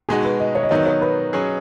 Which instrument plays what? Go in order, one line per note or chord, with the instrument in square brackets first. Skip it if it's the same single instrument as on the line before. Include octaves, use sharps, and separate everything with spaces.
[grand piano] B2 G#3 D#4 F#4 [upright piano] G#4
[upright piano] B4
D#5
C#5
D#5
[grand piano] D#3 F#3 B3 D#4 [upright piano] C#5
[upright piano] D#5
C#5
B4
[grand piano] F#3 C#4 G#4